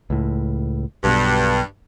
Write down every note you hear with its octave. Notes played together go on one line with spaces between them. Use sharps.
C#2 A2
B1 G2 B2